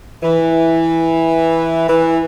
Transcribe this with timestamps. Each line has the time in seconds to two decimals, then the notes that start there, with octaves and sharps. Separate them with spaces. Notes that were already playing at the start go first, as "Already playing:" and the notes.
0.23 E3
1.88 E3